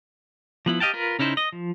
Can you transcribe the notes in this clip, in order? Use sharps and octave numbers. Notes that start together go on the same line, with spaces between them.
F3 B3 E4
G4 D#5 F5 G5 A5
F4 A#4 B4
C#3 C#4 D#4 E4 C5
D#5
F3